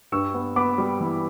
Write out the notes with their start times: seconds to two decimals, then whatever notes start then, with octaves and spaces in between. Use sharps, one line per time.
0.12 G2 C#6 E6
0.34 B3
0.56 B3 B5 D6
0.78 G3
1.01 E3